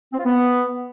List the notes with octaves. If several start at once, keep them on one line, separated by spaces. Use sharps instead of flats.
C4
F4
B3